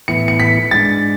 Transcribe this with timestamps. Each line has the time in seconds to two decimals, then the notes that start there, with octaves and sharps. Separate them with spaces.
0.08 A2 E3 B3 E4 C#7
0.28 C#7
0.40 B6
0.71 G#2 G#3 D4 A6